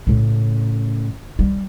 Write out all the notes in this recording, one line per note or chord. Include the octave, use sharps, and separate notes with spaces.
A2 C#3
G3